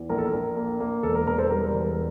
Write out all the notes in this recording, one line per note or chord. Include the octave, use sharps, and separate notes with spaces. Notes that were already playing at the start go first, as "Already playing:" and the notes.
Already playing: E2
A#1 A#4
A4
A#4
A#1
A#3
A#3
E1 A4
A#4
E1 A#4
A4 C5
G3 A#4
E1